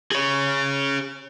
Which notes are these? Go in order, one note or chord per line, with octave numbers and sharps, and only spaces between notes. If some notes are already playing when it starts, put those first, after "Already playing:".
G#4 C#5